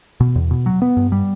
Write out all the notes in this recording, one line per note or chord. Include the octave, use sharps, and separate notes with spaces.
B2
E2
B2
F#3
B3
G2
G3